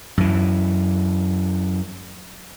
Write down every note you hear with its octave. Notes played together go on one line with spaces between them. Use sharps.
F#2 E3